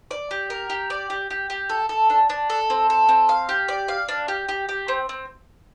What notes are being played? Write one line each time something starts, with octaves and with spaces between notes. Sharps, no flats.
D5
G4
A#4
G4
D5
G4
G4
G4
A4
A4
D4
D4
A4
C4
A4
C4
F5
G4
D5
F5
D4
G4
G4
G4
C4
C4